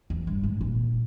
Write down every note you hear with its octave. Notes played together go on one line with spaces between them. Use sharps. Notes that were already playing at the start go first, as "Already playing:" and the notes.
E2
G2
G#2
A#2